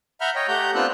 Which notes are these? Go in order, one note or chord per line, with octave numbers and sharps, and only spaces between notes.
E5 F#5 A#5 B5 F6 G6
C#5 D#5 G5
A3 G4 F#5 A#5 G6
B3 C4 D4 F4 E6 F#6